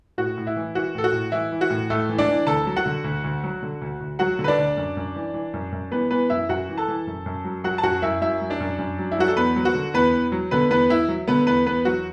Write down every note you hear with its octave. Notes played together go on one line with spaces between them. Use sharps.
A2 F#4
A2
E4
E3
E3 F#4
A2 A4
F#4
A2
E3 E4
E3
F#4
A2
A2 A3 A4
E3
D4 D5
E3
D2 A4 A5
F#3
F#4 F#5
D3
D2
D2
F#3
D3
D2
D2
F#3 F#4 F#5
D3
B4
D4 D5
D2
F#2
F#2
E3
E3
F#2
F#2
E3 B3 B4
E3 B3 B4
F#2 E4 E5
F#2 F#4 F#5
E3
A4 A5
E3
F#2
F#2
F#3
F#3 F#4 F#5
A5
F#2 F#4 F#5
F#2 E4 E5
F#3 E4 E5
F#3
D4 D5
F#2
F#2
F#3
E4
F#3 F#4
A4
E2 B3 B4
F#3
F#4
D3
E2 B3 B4
E2
F#3
D3 B3 B4
E2 B3 B4
E2 E4 E5
F#3
D3 B3 B4
E2 B3 B4
E2 B3 B4
F#3 F#4